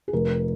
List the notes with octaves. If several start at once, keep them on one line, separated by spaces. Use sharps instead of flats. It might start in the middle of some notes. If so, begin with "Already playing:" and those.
G#4
F1 A#4